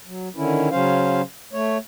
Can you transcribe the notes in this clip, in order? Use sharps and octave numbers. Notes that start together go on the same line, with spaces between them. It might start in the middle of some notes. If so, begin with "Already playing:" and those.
F#3
D3 D#3 C#4 E4
C#3 F#3 C#4 C5 F5
A3 C#5